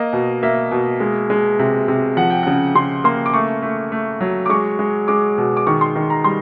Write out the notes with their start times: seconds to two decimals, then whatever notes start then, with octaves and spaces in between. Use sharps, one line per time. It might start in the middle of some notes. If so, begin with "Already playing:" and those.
Already playing: A#3 D#5
0.13 B2
0.43 A#3 E5
0.72 B2
1.00 G#3
1.30 G#3
1.59 C3
1.88 C3
2.17 F3 F#5
2.30 G5
2.43 C#3 F#5
2.75 C#3 C6
3.04 A#3 C6
3.26 D6
3.34 A3 C#6
3.62 A3
3.92 A3
4.21 F#3
4.46 D6
4.50 G#3 C#6
4.79 G#3
5.08 G#3 D6
5.38 B2
5.57 D6
5.67 D#3 C#6
5.81 C6
5.96 D#3
6.10 A#5
6.24 G3 C6